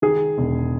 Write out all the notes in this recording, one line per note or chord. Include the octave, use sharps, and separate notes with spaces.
D#3 G#4
E1